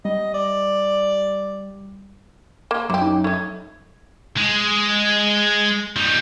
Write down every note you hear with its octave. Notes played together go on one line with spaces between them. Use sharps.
G3 D#5
D5
A#3 C6
F#2 E4 G4 D6
D#4
A3 D#4 G#6
G#3
D#3 G3